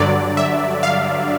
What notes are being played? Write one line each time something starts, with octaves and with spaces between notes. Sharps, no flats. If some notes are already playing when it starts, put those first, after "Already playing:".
Already playing: G2 D3 F#3 D5
E5
F5